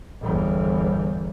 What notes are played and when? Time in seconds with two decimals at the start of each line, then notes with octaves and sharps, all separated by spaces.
0.22 G1 E2